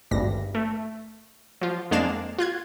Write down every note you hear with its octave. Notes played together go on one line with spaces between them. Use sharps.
G#1 D2 G2 A#6
A3
F3 F4
F2 G#3 A#3 D4 F5 E7
F4 F#6 G#6